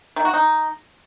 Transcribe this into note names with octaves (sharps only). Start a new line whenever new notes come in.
D#3
F#4
D#4